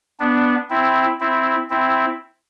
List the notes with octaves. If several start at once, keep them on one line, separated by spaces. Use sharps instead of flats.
B3 D4
C4 E4
C4 E4
C4 E4